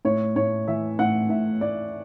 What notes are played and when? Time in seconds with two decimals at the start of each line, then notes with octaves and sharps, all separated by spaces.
0.05 A2 C#5
0.36 A2 C#5
0.68 E3 E5
0.99 A2 F#5
1.29 A2 E5
1.61 A2 D5